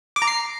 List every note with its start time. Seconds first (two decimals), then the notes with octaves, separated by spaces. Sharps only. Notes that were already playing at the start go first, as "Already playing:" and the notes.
0.16 D6
0.22 A#5
0.27 C7